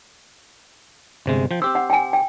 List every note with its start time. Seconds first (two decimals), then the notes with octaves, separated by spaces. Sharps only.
1.26 G1 C3 G#3
1.51 F3 G5
1.62 C4 G4 C5 E6
1.75 F#5
1.90 G5 G#5
2.13 G5